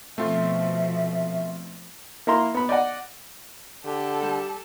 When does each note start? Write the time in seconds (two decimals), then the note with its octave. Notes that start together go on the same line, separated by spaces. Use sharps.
0.18 B2 F3 A3 C4 F4 E5
2.27 A#3 E4 A#5 C6
2.54 B3 B5
2.69 D5 D#5 F#5
3.85 D3 G4 A4
4.22 G3